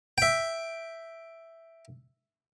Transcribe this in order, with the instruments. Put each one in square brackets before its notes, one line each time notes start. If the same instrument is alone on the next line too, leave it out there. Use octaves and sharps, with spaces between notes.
[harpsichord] E5 G5